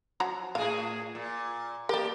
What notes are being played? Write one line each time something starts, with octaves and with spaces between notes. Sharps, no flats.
F3 F#3 A#5
A2 G#4 F5
A#2
A#3 G4 A#4 D5